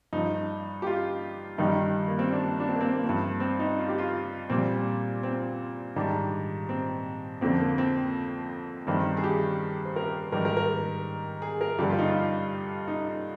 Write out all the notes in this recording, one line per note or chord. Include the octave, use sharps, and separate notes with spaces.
G2 F3 D#4
G4
F4
G2 D#3 G3 D#4
A#3
C4
D4
D4
C4
A#3
C4
A#3
F3 C4
G2
C4
D#4
F4
G4
F4
A#2 G3 C4
C4
G#2 D#3 G3 D4
C4
F2 D3 F3 C4
A#3
C4
G2 D#3 G3 C4
G#4
G4
C5
A#4
G#2 D#3 G3 A#4
A#4
A#4
G#4
A#4
G2 D3 G3 G4
F4
D#4
F4
D#4